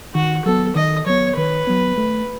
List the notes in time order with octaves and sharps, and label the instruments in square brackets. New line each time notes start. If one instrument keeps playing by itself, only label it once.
[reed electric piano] D#3 [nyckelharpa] F#4
[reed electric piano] F#3 B3 [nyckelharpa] A4
[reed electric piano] D#3 [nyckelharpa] D#5
[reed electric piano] F#3 B3 [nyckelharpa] C#5
[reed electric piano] D#3 [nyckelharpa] B4
[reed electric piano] F#3 B3
A3